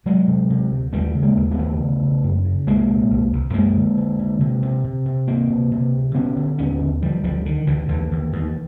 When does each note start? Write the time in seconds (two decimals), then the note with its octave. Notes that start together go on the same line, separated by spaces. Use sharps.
0.06 C3 F#3 G#3
0.28 C3
0.50 C3
0.72 D2
0.93 D#2 G3 A3
1.15 C#3
1.22 G#3 A#3
1.37 D#2
1.51 A3 B3
1.59 D#2
1.79 C#3
2.02 C#3
2.24 F#2
2.45 C#3
2.67 C2 G#3 A#3
2.89 A#2
3.10 C2
3.33 C2
3.53 F#2 G#3 A#3
3.76 D3
3.97 D3
4.19 D3
4.40 C3
4.63 C3
4.84 C3
5.06 C3
5.28 D2 A#3 C4
5.50 C3
5.71 C3
5.94 D2
6.14 D3 B3 C#4
6.36 D3
6.58 D#2 B3 C#4
6.81 D3
7.02 D3 F3 G3
7.23 D2 F3 G3
7.45 D3 D#3
7.67 D2 D3 E3
7.88 D#2 D3 E3
8.11 D#2
8.33 D#2